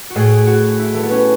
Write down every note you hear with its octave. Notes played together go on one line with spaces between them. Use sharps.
F#4
A2 G#4
F#4
E4
A3
B3
C#4